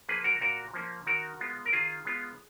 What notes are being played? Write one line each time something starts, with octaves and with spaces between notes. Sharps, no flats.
F3 A#3 C#4 G#4 B4
F#4 A#4
A#2 F#4 A#4
F3 A#3 C#4
D#3 F#4 A#4
G#3 B3 F4
A#4
D#3 F4 G#4
G#3 B3 F4